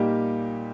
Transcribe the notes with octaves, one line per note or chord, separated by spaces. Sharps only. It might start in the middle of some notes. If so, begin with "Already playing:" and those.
Already playing: A#2 G3 A#3 D#4 G4